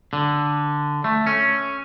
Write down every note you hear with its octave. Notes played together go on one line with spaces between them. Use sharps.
D3
A3
C#4